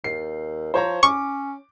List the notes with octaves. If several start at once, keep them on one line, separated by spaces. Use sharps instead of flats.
D#2 C7
F3 C5 C#5 A#5
C#4 C#6 D6